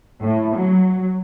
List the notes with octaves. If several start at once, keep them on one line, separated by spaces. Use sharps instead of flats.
A2
F#3